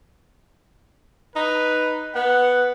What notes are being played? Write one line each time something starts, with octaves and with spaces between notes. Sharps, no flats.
D#4 B4
B3 F#5